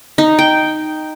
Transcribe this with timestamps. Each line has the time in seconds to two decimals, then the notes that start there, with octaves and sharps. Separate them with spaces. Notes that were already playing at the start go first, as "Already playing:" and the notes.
0.18 D#4
0.39 G5